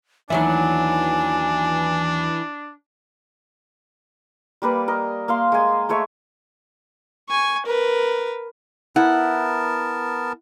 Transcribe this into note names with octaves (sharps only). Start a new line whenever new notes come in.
D#2 E3 F#3 D4 E4 G#5
G3 A#3 B4 D5
A#4 D#5
A#3 F5 C6
G#3 G#5
G#3 A3 C#5 E5
G#5 C#6
A#4 B4
B3 E4 A#4 F#5 A5